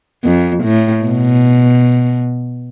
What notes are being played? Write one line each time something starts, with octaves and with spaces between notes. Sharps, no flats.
F2
A2
B2